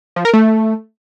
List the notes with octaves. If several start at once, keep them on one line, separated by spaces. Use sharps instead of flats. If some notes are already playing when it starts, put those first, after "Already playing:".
F3
A#4
A3